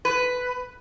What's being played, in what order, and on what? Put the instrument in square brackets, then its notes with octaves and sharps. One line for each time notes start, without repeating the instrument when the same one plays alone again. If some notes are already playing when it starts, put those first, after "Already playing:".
[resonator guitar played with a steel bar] B4